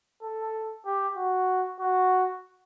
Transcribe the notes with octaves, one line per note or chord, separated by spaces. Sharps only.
A4
G4
F#4
F#4